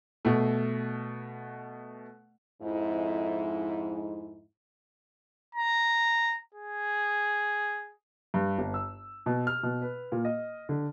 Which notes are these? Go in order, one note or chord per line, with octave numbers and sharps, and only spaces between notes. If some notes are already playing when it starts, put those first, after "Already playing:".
B2 A3
F2 G#2 E4
A#5
G#4
G2
G1
E6
B2
F6
B2
B4
A#2
D#5
D3